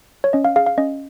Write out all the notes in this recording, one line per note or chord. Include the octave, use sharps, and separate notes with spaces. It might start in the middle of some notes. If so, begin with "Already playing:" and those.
C#5
C#4 D#5
F5
G#4 F5
F5
C#4 D#5